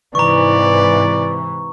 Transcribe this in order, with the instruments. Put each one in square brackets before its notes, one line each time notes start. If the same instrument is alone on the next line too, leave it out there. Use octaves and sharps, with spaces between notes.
[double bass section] G#2 C3 E3 [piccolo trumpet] D5 [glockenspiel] A#5 C#6